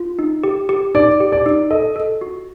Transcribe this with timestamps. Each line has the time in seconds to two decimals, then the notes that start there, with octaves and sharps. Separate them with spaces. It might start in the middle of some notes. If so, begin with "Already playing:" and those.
Already playing: F4
0.19 D#4
0.44 G4
0.69 G4
0.95 D#4 D5
1.20 G4
1.32 D5
1.46 D#4
1.71 A4 D#5
1.96 A4
2.21 F#4